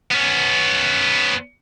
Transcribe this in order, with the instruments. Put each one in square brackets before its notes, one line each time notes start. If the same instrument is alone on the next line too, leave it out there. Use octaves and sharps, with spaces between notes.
[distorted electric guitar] B3 C#4